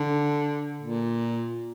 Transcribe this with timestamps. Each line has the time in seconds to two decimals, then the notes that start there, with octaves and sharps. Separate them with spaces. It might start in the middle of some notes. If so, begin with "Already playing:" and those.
Already playing: D3
0.82 A#2